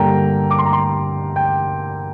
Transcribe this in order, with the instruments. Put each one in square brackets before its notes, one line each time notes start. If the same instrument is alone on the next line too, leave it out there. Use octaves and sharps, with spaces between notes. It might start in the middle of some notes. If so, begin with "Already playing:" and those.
Already playing: [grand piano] G2 D3 G3 A#3 G5 A#5
D6
C6
A#5
C6
G5